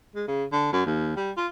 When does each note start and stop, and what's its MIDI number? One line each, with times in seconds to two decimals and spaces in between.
0.15 0.26 56
0.28 0.44 49
0.52 0.69 50
0.73 0.84 42
0.86 1.14 39
1.16 1.31 55
1.37 1.47 65